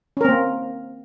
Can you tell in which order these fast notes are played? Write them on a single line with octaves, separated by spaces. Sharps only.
C#4 A#4 C4 A#3